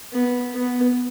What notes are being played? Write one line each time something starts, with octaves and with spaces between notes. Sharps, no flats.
B3
B3